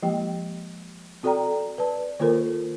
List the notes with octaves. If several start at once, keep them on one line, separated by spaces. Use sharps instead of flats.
F3 G#3 A#3 G4 G5
C4 F#4 A4 D5 G5 A#5
B4 D5 A5
D#3 A#3 F4 A4 A#4 C5